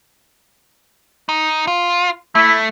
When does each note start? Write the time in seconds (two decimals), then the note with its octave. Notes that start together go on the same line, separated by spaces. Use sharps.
1.29 D#4
1.67 F4
2.35 A3 E4